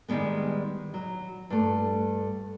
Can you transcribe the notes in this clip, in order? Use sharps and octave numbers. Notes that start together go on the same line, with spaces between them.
D#3 E3 G3 G#3 B3
F#3
G2 A3